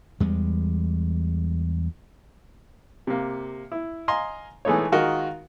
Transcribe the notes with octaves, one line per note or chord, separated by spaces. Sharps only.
E2 G3 G#3
C3 A#3
E4
D#5 F5 G#5 A#5 C6
E3 G#3 A3 B3 D#4 C#5
D#3 G#3 F4 F#4 A#4 D#5